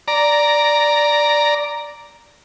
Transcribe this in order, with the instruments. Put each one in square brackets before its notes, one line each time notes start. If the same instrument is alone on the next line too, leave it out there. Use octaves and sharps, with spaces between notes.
[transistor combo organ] D5 A#5